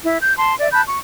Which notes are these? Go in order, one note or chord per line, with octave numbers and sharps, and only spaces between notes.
E4
G6
A5 C6
D5 E5
A5 B5 F#6 G6
C#6